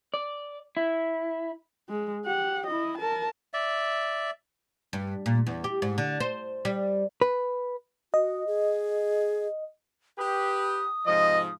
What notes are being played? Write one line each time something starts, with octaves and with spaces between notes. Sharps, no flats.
D5
E4
G#3
G4 F#5
E4 D#5
A#4 A5
D5 E5
G2
A#2
E2
G4
G#2
D3
C5
G3
B4
F#4 D#5
G#4
G4 B4 D#6
G#2 C3 F3 D#5